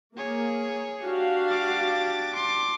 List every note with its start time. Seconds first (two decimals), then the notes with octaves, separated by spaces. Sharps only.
0.17 A#3 G#4 C#5
1.03 D4 F#4 G4 F5
1.48 D6 A6
2.34 C6 D6